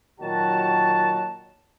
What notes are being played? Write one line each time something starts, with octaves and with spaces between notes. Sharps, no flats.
A#2 D#3 F#3 F#4 A5